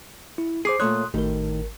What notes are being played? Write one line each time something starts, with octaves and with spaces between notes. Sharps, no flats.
E4
G#4 C5 D6 C7
A#2 A3 C#5 C6 D#6 F#6
G#1 A2 D#3 A#4